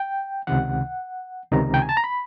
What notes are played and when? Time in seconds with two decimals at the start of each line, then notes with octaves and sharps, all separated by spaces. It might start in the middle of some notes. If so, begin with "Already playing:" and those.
Already playing: G5
0.47 C#2 C3 D#3 F#5
1.51 C#2 C3 D#3 A#5
1.74 G5
1.82 G#5
1.89 A5
1.97 A#5
2.04 B5